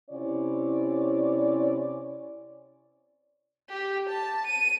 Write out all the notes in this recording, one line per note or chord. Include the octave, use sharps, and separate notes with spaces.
C3 C#4 E4 C#5 D5
G4
A5
D#7